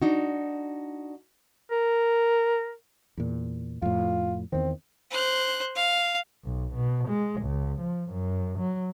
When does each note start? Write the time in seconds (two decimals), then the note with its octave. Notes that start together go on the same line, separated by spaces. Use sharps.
0.02 D4 D#4 F#4
1.71 A#4
3.17 E2 A#2
3.82 F2 A2 F4
4.52 E2 D#3 C4
5.10 C5 F#6
5.75 F5
6.44 B1
6.74 B2
7.08 G#3
7.42 C#2
7.80 F3
8.11 F#2
8.59 F#3